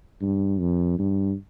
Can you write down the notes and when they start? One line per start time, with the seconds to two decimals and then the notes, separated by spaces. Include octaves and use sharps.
0.22 G2
0.60 F2
0.99 G2